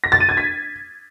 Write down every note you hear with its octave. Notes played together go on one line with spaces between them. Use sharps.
A#6
A6
D#7
G#6
B6